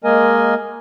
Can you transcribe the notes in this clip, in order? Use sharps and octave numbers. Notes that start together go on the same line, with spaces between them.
G#3 A#3 A#4 D#5 G#5